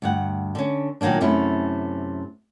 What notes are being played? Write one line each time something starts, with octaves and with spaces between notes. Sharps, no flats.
D2 G2 F#5
D3 C#4
A#2 D#3 F#3 A#3 D4
F#2 C3 A3 C#4 E4